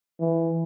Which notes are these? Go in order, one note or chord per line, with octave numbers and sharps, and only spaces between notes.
E3